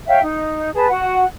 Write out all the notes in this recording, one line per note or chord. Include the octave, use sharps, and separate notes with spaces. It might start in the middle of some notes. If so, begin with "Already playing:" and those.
C#5 E5 F5 G5
D#4
G#4 B4 A5
F#4 F#5